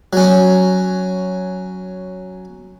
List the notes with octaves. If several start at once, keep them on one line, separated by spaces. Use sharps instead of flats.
F#3 C#4